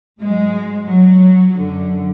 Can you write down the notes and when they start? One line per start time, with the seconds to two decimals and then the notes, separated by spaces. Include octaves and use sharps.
0.20 G#2 F#3 G#3
0.87 F#3
1.55 F#2 D3 F#3